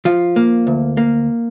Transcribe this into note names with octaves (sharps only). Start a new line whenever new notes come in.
F3 F4
A#3
D2
A#3